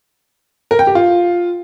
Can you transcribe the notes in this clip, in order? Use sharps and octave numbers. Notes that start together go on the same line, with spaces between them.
A#4
G5
G4
F4